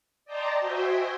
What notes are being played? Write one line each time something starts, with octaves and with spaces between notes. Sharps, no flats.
D5 D#5 G5 A5 A#5 C6
F#4 C5 D#5 E5 G5 G#5